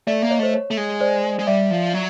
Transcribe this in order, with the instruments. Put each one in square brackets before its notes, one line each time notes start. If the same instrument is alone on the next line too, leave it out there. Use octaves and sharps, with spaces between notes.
[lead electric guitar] A3 [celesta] D5 E5
[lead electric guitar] A#3
[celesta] C#5 D#5
[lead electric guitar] A3 [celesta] C5
[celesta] C#5
[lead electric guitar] A3
G#3
[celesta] C5 D5
[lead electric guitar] G#3
[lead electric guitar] G3 [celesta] D5 E5
[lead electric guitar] F3
F#3